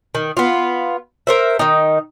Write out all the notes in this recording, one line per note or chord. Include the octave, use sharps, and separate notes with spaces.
D#3
B3 F4
A#4 C5 E5
D#3 D#4